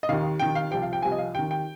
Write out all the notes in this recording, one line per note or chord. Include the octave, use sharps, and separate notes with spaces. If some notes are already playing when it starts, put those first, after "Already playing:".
D#5
D#2 D#3 F5
D#2 D#3 G5
F5
C2 C3 F3 G5
F5
G5
C2 C3 F3 G#5
D#5
F5
D#2 D#3 G5
G5